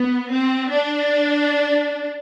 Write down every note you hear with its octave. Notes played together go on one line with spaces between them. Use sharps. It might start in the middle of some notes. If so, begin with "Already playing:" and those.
Already playing: B3
C4
D4